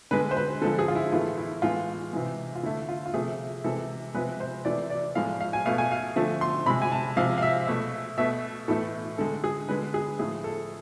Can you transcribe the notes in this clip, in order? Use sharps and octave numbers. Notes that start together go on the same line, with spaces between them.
D3 G#3 B4
C5
B4
D3 F3 G#3 A4
G#4
F4
E4
A2 E3 A3 F4
E4
A2 E3 G#3 F4
C3 E3 G#3
F4
D3 A3 E4
F4
F4
C3 F3 A3 G#4
C3 E3 G#3 A4
C3 F3 G#3 B4
C5
C3 E3 A3 D5
D5
A2 F3 G#3 F5
F5
G#5
B2 A3 F5
G#5
F5
D3 F3 A3
C6
C3 G#3 B5
G#5
A5
C3 F3 G#3 F5
F5
E5
B2 A3
B2 A3 E5
A2 E3 A3 A4
D3 G#3 A4
G#4
D3 G#3 B4
G#4
A2 F3 A3 G#4
A4